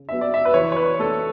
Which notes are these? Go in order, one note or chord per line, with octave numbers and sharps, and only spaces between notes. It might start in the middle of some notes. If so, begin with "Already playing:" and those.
Already playing: C#3
F#3 B3 D4 E5
D5
E5
B4
E3 C#5
C#5
B4
A3 D4 A4